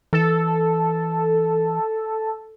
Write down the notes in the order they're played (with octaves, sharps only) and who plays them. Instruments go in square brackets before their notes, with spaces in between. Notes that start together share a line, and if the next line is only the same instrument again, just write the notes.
[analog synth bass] E3 [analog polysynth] A4